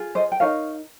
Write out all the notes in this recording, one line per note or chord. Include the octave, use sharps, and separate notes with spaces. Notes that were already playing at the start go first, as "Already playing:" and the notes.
Already playing: F4 G#4
C5 D#5
G5
D#4 A#4 C#5 F5